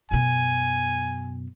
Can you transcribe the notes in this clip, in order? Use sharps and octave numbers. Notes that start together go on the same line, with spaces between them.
F#2 B2 G#5